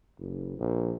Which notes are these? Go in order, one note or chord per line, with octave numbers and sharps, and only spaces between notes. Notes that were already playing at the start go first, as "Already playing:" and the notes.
F#1
A#1